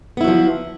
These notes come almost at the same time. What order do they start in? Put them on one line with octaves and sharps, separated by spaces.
B3 E4 F#3 F3